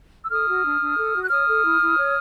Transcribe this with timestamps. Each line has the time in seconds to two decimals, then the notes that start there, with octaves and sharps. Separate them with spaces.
0.24 E6
0.30 A4 D#6 F6
0.48 F#4
0.65 D4
0.81 D4
0.98 A4
1.15 F#4
1.22 F#6
1.31 C#5 D#6 F6
1.47 A4
1.64 E4
1.81 E4
1.98 C#5